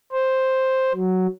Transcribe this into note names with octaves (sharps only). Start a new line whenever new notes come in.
C5
F#3